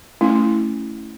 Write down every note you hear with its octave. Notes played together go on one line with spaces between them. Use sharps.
A3 C#4 E4